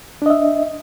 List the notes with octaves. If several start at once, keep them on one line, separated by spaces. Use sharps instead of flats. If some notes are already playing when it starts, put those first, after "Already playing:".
D4 D#5 E5